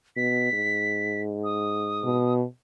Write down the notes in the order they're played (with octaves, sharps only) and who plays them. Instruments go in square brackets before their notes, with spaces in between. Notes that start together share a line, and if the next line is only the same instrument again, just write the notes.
[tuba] B2 [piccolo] B6
[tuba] G#2
[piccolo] D#6
[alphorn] B2